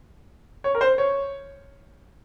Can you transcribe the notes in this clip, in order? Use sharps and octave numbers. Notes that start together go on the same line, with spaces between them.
C#5
A#4
C5
C#5